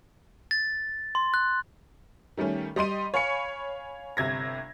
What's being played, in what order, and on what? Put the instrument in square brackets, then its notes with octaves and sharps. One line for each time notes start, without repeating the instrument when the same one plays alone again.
[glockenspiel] A6
C6
F#6
[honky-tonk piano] D#3 G3 A3 C#4
G3 D#5 C6 D#7
C#5 F5 G#5 B5 C#6 C#7
G1 C3 G#6 A#6